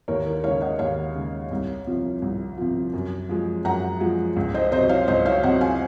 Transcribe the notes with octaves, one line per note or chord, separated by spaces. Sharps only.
D#2 A#4 C#5
A#4
C#3 G#3 C#5 F5
D#5 F#5
D#2 C#5 F5
C#3 G#3
C2
C3 F3
C2
C3 F3
F#2
F3 G#3
F#2 F#5 A#5
F3 G#3
C#2
C5 D#5
C3 F#3 C5 D#5
C#5 F5
C#2 C5 D#5
C#5 F5
C3 F#3 D#5 F#5
F5 G#5